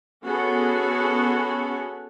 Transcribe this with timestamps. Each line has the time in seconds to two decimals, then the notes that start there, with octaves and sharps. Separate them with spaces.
0.24 B3 C#4 F#4 G#4 A4